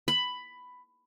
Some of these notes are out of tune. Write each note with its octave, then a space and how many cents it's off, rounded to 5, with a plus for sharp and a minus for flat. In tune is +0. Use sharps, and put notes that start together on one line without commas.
B5 +10